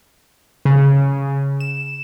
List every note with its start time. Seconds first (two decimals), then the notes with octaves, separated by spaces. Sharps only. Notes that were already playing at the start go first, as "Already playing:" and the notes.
0.65 C#3
1.60 E7